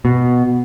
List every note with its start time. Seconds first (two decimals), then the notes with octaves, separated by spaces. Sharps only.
0.05 B2